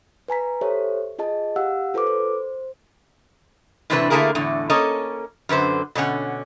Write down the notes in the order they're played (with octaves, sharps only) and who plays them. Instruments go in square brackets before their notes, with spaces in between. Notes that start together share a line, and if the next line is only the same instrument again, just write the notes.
[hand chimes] B4 G#5 A#5 B6
G4 A4 C5 C#5 E5
F4 G#4 D#5 A5
G4 F5 F#5 E6
F4 A4 B4 C5 D6
C5
[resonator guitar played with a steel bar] A2 C3 E3 C4 D4 B4
D3 A3 A#3 E4 G#4 A#4
E2 A2 D3
A#3 C#4 A4 C#5 D#5
F#2 D3 B4 C5
B2 D3 C#4 F#5